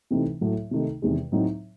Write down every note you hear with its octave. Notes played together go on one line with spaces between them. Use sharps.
C3 E3 A3 C4 D#4
A2 F#3 A3
C3 D#3 A3 D#4
E2 C3 D#3 G#3
A2 F#3 C4 D#4